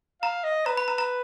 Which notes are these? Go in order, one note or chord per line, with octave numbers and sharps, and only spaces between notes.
F5 A#5
D#5
B4 A#5
B5
A#5
A#5